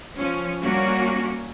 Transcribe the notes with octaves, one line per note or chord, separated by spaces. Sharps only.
F3 C#4
G3 A#3 C#4 F#4